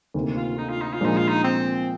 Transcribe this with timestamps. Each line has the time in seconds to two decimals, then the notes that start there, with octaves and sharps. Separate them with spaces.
0.14 D2 C3 D#3 A#3
0.36 F4
0.58 D#4
0.70 F4
0.82 D#4
0.94 F4
1.01 A#2 F3 G#3 D4 D#4
1.17 F4
1.29 D#4
1.44 C4